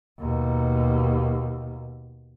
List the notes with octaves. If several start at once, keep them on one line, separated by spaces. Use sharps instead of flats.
D#2 B2